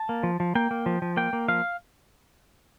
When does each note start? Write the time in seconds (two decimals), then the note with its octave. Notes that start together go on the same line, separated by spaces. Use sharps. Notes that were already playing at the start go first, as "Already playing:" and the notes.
Already playing: A5
0.09 A#3
0.23 F3
0.40 F3
0.55 A#3 G5
0.71 A#3
0.86 F3
1.02 F3
1.17 A#3 G5
1.33 A#3
1.48 F3 F5